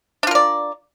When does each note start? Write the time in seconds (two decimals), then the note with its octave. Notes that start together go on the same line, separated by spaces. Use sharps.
0.23 D4
0.27 F4
0.31 A#4
0.35 D5